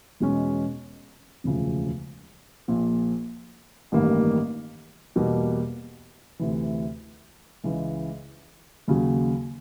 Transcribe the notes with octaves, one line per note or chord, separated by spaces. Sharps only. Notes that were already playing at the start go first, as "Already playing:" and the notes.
E2 B2 G#3 C#4
E1 D2 C#3 F3
A#1 A#2 F3
A1 G2 D#3 G3 A#3
E2 B2 G3 A#3
D2 C3 E3
C#2 C#3 E3 G#3
D#2 C#3 F#3